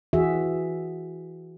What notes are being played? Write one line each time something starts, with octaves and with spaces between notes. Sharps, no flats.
E3 F#4 G#4 E5